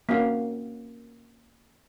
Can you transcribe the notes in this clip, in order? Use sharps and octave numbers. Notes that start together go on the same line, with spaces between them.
A#3 C4 C#4 F#4 F5